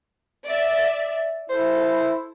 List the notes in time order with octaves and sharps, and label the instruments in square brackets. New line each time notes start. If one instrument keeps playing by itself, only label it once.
[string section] D5 E5
[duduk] E4 [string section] A4 [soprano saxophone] C5